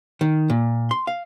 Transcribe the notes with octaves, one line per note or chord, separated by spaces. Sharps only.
D#3
A#2
C6
F5